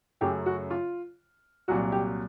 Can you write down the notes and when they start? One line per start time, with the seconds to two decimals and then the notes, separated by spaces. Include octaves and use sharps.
0.21 F#2 C#3 F#3 A3 C#4 G4
0.46 F#4
0.70 F4
1.68 C2 A#2 F#3 F#4
1.92 G4